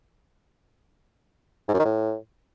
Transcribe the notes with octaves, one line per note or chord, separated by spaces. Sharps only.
G#2
F#2
D#3
A2